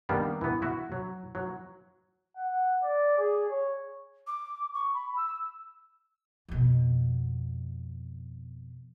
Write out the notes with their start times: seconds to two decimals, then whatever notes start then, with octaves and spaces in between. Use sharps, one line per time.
0.09 D#3 G3 A#3 B3 D4
0.41 E3 B3
0.62 E4 F#4
0.92 F#3
1.35 F#3
2.36 F#5
2.83 D5
3.18 G#4
3.50 C#5
4.27 D6
4.73 C#6
4.93 B5
5.16 E6
6.49 F2 B2